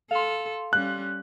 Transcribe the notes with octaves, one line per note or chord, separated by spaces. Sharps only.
A4 F5 C6
G3 C#4 F#6